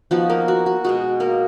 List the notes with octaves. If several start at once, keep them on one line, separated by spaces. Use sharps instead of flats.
F3 B3 D#4 F#4
A#3 A#4
F#4
F#4
B2 G#3 D#4 F#4
A#3 A#4